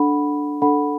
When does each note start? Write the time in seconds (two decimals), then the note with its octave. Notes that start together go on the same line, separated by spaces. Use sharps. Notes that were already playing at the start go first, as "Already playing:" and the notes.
Already playing: D4 A4 F#5 B5
0.62 D4 A4 F#5 B5